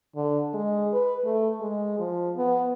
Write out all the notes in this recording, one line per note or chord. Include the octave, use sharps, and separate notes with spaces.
D3
G#3
B4
A3
G#3
F3
B3